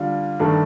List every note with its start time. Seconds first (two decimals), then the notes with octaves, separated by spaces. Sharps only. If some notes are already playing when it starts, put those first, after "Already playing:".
Already playing: D3 G3 D4 F4
0.40 G2 D#3 A3 D4 A4